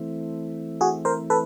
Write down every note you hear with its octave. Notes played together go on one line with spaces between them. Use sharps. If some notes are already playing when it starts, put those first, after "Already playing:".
Already playing: E3 A3 C4 E4
F#4 G#4
A#4 C5
A4 B4